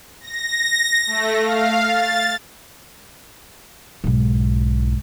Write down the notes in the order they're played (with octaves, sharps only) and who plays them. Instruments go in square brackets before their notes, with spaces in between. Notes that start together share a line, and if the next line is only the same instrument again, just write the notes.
[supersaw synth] A#6
A3
F5
A6
[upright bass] B1 G#2